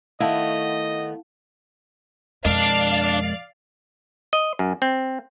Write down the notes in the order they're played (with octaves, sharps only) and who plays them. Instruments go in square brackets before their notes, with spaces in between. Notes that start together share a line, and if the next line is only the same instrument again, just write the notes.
[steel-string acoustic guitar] D#3 A3 B3 [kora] E4 [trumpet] D#5 [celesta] F5 F#5 A5
[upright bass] F2 B2 [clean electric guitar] G#3 A#4 D#5 [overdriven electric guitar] D4 [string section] D5 F5
[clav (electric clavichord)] D#5
F#2
C4